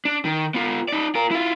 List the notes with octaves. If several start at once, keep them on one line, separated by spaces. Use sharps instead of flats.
D4
D#3
B3 F4
D#4 D5
F4 A#4
E4 F4